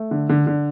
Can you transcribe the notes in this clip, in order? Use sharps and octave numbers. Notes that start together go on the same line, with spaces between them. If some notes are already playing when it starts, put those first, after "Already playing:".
Already playing: A3
D3
D3
D3